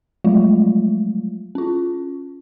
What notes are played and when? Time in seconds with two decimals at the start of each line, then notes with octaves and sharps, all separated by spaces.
0.24 F3 F#3 G#3 A3 F4
1.55 C#4 F4